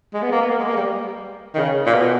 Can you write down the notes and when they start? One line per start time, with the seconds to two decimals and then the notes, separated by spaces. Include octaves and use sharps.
0.14 G#3
0.22 B3
0.32 A#3
0.41 B3
0.49 A#3
0.59 G#3
0.67 A#3
0.77 G3
1.54 D#3
1.58 C#3
1.86 A#2
1.94 B2